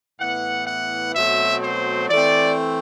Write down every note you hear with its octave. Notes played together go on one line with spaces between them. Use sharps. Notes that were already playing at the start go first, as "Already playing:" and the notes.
A2 E3 B3 F#5
F#5
B2 F#3 A3 C4 E5
C5
E3 A3 C4 D5